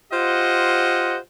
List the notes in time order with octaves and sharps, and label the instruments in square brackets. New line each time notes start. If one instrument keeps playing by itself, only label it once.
[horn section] F4 G4 C5 D#5 F#5